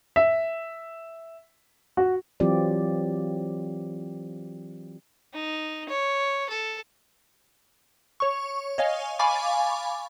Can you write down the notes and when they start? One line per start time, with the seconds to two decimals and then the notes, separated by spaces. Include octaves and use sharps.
0.16 E5
1.97 F#4
2.40 E3 F#3 C4 F4 G4 D5
5.34 D#4
5.89 C#5
6.50 A4
8.20 C#5 C#6
8.78 C#5 D#5 F5 G#5
9.19 F5 G#5 B5 C#6 D6 A6